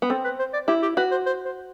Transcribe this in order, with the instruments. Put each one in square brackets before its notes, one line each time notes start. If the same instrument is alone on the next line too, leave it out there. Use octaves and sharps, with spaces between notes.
[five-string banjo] B3
[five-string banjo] C4 [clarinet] A4
[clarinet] B4
C5
D5
[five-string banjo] E4 [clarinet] G4
[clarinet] G4
[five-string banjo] F#4 [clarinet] B4
[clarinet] C5
C5
C5